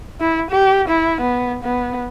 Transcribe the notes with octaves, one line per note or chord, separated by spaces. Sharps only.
E4
G4
E4
B3
B3